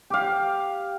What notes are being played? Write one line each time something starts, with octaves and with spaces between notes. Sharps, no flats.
G4 F5